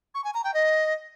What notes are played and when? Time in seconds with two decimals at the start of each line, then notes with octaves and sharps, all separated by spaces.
0.15 C#6
0.24 G#5
0.34 A#5
0.44 G5
0.54 D#5